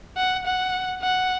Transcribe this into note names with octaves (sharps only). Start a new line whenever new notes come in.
F#5
F#5
F#5